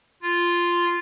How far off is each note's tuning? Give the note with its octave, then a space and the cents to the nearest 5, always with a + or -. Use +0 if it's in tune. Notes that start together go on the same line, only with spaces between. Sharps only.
F4 -5